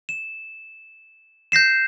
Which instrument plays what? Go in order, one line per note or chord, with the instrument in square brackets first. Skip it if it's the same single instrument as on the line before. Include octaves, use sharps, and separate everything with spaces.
[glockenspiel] E7
G6 A#6 C7 E7